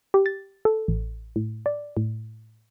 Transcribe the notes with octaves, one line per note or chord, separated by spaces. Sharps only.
G4
A6
A4
A1
A2
D5
A2